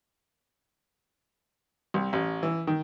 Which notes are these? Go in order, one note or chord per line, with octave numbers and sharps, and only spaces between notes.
C2
A1
E3
D#3